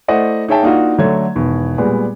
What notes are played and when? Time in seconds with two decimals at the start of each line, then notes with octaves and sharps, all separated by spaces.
0.08 A3 E4 C5 D5 D#5 F#5
0.48 D#4 G#4 C#5 E5 G5 A5
0.63 A#3 D4 D#4 F4 F#4
0.98 D3 F#3 A3 C#5 G#6
1.35 E1 B2 D#3
1.78 A#2 G3 G#3 B3